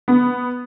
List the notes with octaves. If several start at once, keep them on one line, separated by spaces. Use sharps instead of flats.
B3